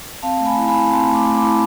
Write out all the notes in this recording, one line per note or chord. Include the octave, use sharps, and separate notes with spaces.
C4 F5 A5
A3
G#5 B5
E4
G#5 B5
E4
C4 A5 C6
A3
B5 D6
A3
B5 D6
E4